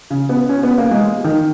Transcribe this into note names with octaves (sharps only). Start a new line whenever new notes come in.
C#3
B3
C#4
B3
A#3
G#3
D#3